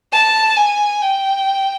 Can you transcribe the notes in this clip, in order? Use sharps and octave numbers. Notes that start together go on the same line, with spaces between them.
A5
G#5
G5